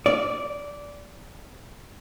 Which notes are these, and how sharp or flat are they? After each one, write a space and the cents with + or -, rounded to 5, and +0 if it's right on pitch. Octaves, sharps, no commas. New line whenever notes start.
D5 -15